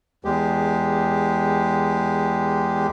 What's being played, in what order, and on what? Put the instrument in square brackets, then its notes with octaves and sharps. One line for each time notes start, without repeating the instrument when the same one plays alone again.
[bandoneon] E2 G#3 G4